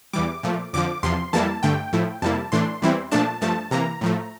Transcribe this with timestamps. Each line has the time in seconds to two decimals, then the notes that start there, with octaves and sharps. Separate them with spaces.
0.13 E2 E3 G3 D6
0.43 A#2 F3 A3
0.73 F2 D3 F3 D6
1.03 E2 C3 F3 C6
1.33 F2 E3 G3 A#3 E4 A5
1.63 G2 D3 A3 G5
1.93 A2 F3 A3 E4
2.22 F2 C3 G3 A#3 E4 A5
2.52 A2 E3 A3 D4 C6
2.82 E2 E3 G3 C4 E4
3.12 A#2 F3 A3 D4 A5
3.41 G2 F3 A3 A5
3.71 C3 E3 A#3 A#5
4.01 A2 F3 A3